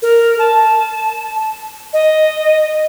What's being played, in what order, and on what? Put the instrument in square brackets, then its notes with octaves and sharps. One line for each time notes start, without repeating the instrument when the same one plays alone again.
[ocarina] A#4
A5
D#5